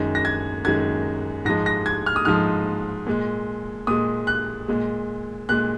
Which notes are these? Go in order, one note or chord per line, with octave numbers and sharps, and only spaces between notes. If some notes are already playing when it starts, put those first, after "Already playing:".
Already playing: F#2 D#3 G#3
A#6
G#6
F#2 D#3 G#3 G#6
G#2 F3 G#3 A#6
A#6
G#6
F6
D#6
G#2 F3 G#3 F6
A#2 G#3
A#2 G#3 D#6
F#6
A#2 G#3
A#2 G#3 F#6